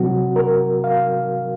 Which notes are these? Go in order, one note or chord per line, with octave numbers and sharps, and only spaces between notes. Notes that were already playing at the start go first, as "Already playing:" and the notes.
Already playing: C3 F#3 C4 F#4
A#4
F5